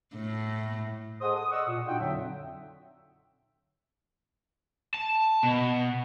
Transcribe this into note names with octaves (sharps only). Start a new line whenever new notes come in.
A2
G#4 A4 C5 D#5 F#5 D#6
D#6
D5 D#5 F#5 C#6 D#6 E6
A#2
D4 D#4 F4 F#4 F#5 G5
F2 D3 F#3 C4 E5
A5
B2